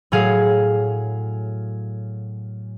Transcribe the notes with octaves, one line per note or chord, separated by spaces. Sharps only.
A2 F#3 G#4 F5